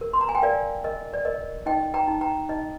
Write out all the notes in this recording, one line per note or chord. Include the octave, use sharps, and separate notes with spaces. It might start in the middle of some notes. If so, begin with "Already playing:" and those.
A#4
C6
A#5
G#5
G5
A#4 D5 F5
A#4 D#5
D5
A#4 D#5
D#4 D#5 G5
G5 A#5
D#4
G5 A#5
D#4 D#5